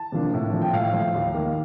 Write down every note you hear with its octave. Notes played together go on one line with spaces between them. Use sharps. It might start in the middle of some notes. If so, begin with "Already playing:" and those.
Already playing: A5
C3 F3 A#3 D4
A2
F3 A3
G5
A2 F5
F3 A3
D#2
D#3 A#3